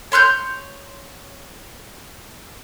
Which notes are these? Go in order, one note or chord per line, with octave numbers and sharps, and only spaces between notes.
C#5 C6 F6 G6